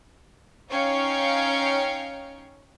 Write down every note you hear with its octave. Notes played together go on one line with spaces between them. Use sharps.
C#4 D#4 C#5 F5 G5 C#6